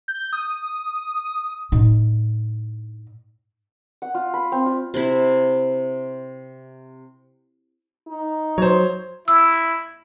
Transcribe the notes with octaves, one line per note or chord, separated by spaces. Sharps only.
G6
D#6
A2 D#4
F#5
F4
B5
C4
F4
C3 E4
D#4
F#3 C5 C#5
E4 E6